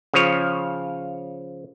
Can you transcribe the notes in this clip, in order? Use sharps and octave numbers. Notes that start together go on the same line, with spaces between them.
C#3 F3 C#5